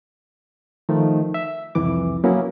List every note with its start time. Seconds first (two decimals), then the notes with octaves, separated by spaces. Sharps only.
0.89 D#3 F3 A3
1.34 E5
1.75 C2 F2 E3 D6
2.24 F#3 A#3 B3 C#4 E4